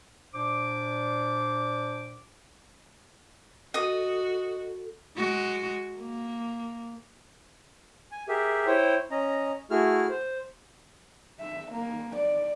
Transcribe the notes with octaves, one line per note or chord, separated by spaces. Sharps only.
A#2 D4 C5 D6
F#4 A4 D#5 D#6
G#3 F#4
A#3
G#5
G4 G#4 A#4 E5
E4 C5 C#5 G5
C#4 D#5 A#5
A3 E4 F#4 G#4 F6
C5
E5
A#3
D5